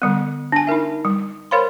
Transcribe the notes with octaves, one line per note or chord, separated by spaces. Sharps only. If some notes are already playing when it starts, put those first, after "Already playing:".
D3 G3 B3
D4 G#5
D#4 E4 A#4 E5
G3
A#4 C5 C#5 F5 B5 C6